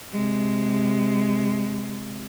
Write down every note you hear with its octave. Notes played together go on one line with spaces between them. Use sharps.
C3 G#3